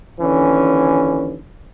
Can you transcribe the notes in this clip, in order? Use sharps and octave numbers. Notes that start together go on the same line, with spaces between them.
D#2 D3 E3 C#4